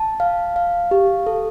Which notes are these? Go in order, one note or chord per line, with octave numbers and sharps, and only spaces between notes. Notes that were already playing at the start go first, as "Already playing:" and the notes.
Already playing: A5
F5
F5
G4
A4